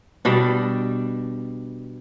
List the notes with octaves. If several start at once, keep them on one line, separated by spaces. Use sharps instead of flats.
B2 G3 D4